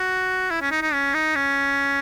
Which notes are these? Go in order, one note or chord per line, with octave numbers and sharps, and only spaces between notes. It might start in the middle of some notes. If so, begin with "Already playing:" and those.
Already playing: F#4
E4
C#4
D#4
D#4
C#4
D#4
C#4